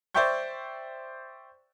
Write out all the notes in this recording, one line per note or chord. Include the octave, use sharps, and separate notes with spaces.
C5 D5 E5 G5 C#6 G6